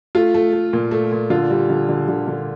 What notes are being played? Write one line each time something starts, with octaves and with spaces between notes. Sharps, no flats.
A3 F4
A3
A3
A#2
A3
A#2
D3 F4
G3
D3
D3
D3
D3